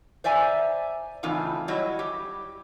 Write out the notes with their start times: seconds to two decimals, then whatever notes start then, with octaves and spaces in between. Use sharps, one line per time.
0.24 C5 D5 E5 G#5 A#5
1.23 A2 C#3 E3 C4 D#4 F4
1.68 F#3 G3 E4 C#5 D#5
1.99 G4